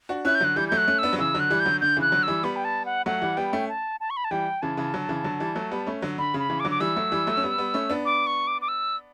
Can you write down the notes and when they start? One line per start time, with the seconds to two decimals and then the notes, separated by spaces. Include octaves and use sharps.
0.09 D4 F#4
0.25 C#4 E4 F#6
0.35 G6
0.41 D3 F#3 F#6
0.56 E3 G3 G6
0.69 G6
0.72 F#3 A3
0.77 F#6
0.87 A3 C#4
0.99 B3 D4 E6
1.13 F#3
1.18 C#3 E3 E6
1.34 D3 F#3
1.40 F#6
1.50 E3 G3
1.60 G6
1.66 D3 F#3
1.81 D3 G6
1.97 C#3 E3 F#6
2.12 D3 F#3
2.23 E3 G3 E6
2.43 G3 B3 B5
2.56 G5
2.64 A5
2.86 F#5
3.06 F#3 A3 F#5
3.22 E3 G3
3.37 G3 B3 G5
3.53 A3 C#4
3.69 A5
4.00 A5
4.10 C#6
4.17 B5
4.24 A5
4.31 E3 G3 G5
4.62 C#3 E3 A5
4.77 C#3 E3
4.94 D3 F#3
5.09 C#3 E3
5.24 D3 F#3
5.40 E3 G3
5.55 F#3 A3
5.71 G3 B3
5.87 A3 C#4
6.02 D3 F#3
6.18 D3 B5
6.34 C#3
6.39 B5
6.50 C#3 E3
6.60 D6
6.65 D3 F#3
6.71 D6
6.80 E3 G3 E6
6.96 F#3 A3
7.12 E3 G3
7.27 F#3 A3
7.37 C#4
7.43 G3 B3
7.58 G3 B3
7.74 A3 C#4
7.90 B3 D4
8.05 D6
8.27 C#6
8.47 D6
8.62 D6
8.68 E6